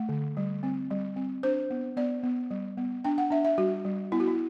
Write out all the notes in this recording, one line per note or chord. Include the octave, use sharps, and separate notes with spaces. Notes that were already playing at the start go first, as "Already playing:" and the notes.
Already playing: A3 F#5
D3
G3
C4
G3
C4
D4 C5
B3
B3 D5
B3
G3
B3
D4 G5
F#5
D4 E5
E5
G3 F#4
G3
B3 E4
F#4
E4